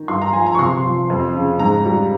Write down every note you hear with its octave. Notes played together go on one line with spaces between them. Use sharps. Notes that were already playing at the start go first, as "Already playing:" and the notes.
Already playing: D#3
G2 C6
A#5
F3 G#5
A#5
C#6
C3 C6
F3
F2
C#3
G#2 A#5
G3